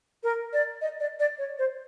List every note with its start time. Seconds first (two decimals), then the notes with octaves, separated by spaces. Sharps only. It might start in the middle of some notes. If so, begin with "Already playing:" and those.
0.23 A#4
0.53 D5
0.82 D#5
1.00 D5
1.20 D5
1.38 C#5
1.59 C5